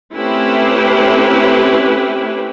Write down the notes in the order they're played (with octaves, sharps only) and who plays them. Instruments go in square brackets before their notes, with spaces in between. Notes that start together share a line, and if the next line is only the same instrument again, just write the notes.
[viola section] A3 C4 C#4 E4 G4 B4